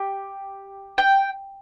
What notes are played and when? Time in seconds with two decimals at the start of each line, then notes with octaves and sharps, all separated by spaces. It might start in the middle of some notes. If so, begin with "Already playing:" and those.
Already playing: G4
0.98 G5